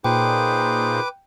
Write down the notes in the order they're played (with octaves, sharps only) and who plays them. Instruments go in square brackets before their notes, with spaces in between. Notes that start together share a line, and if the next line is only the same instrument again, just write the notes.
[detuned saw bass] A#2 [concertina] D#4 G#4 C5 [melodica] B4 D6 [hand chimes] G5